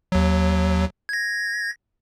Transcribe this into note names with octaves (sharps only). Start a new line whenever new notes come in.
D#2 F#3
G#6 A#6